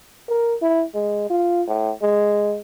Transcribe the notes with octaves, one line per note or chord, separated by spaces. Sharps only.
A#4
E4
G#3
F4
A2
G#3